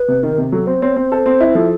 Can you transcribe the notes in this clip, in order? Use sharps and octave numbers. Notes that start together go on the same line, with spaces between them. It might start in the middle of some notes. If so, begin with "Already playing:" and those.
Already playing: B4
C3
D#3 A#4
C3
F#3 A4
C4 C5
C4 C#5
C4 C5
A4
C4
E4
F3 A4